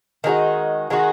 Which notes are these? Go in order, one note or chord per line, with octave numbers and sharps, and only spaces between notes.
D#3 G#3 D#4 F#4
D#3 G#3 D#4 F#4